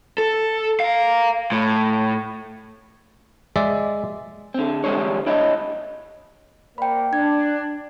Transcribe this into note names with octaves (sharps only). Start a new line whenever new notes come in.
A4
A#4 F5
A2
G#3 D5 E5
D3 C4
D3 E3 G3 G#3 C5 C#5
C2 D4 E4 C#5 D#5
A#3 C5 D5 G5 B5
D4 G#6